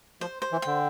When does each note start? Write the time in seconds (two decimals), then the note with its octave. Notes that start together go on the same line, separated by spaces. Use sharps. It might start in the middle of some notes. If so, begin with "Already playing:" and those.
0.21 F3 C5
0.42 C5
0.52 E3
0.62 D3 G5